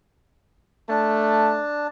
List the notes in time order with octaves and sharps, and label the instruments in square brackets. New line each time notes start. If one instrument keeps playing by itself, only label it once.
[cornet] A3 [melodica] D4 A5